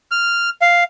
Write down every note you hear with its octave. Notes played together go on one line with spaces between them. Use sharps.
F6
F5